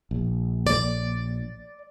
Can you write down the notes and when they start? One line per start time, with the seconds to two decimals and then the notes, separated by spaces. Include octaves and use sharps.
0.11 A#1
0.67 D5